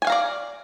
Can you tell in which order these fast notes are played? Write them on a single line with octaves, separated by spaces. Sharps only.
G#5 G5 F5 A#5 D5